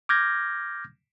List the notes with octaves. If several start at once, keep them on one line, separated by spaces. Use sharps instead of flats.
D6 F6 G6 G#6 A#6